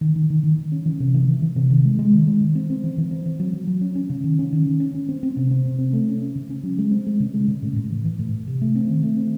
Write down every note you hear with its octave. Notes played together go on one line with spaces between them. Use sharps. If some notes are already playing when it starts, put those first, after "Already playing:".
D#3
D#3
D#3
D#3
D#3
C#4
E3
C3
E3
E3
E3
C3
D#3
G#3
G#3
D#3
G#3
D#3
C4
C4
E3
E3
C4
E3
F#3
F#3
F#3
C#4
C#4
C#3
D#3
C#4
D#3
D#3
C#4
C#4
C4
C4
C3
C4
C3
C4
A3
C#4
C#4
C#3
C#4
F#3
G#3
C4
G#3
C#3
G#3
C#3
A2
A2
E3
E3
A2
A2
C3
A3
C4
D#3
A3
C4